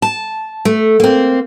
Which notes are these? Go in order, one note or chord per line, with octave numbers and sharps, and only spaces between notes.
A5
A3
A#3 C4